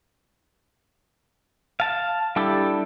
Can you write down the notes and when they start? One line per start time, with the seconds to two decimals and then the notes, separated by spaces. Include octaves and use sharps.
1.80 F5 A5
2.36 G3 D4 E4 G4 A4